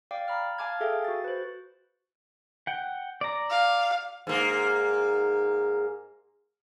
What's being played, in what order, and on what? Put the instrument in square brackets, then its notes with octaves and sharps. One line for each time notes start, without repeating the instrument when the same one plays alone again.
[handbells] D5 F5 G5 D6
A#5 B5 F6
F5 G#5 A5 D6 F6 G#6
G#4 A4 E5 F5 G5
F#4 A6
B4 C5
[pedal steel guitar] F#5 G5
D5 A#5
[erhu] F5
[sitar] G#2 A#3